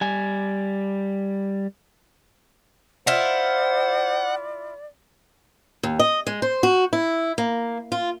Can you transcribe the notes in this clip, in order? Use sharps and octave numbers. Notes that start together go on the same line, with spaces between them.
G3 G#5
E4 F4 C5 D5 F#5
D#2
D#5
G#3
C5
F#4
E4
A#3
F4